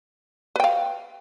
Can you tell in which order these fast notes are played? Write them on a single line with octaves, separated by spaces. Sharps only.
B4 G5 F5